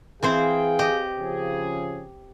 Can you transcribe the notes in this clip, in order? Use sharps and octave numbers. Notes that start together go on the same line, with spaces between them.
E3 C4 G#4 C5 F5 G5
G4 D#5
C#3 F3 G#4